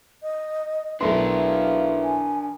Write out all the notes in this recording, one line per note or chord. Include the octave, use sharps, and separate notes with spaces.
D#5
B1 E3 A3 D4 A#4 E5 C6
F5
G#5